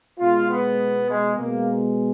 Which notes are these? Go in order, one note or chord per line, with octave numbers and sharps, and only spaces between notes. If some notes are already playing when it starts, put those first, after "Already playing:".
B2 G#3 F4
B3
G#3
B2 G#3 A#3